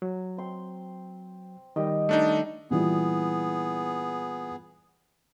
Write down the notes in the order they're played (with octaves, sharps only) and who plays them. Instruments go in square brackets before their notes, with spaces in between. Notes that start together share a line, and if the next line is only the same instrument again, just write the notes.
[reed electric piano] F#3
[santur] C4 C6
[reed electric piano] D#3 G3 [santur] G4 D#5
[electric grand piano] A3 D4 D#4
[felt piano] A#2 E3 G3 [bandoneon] B3 G#4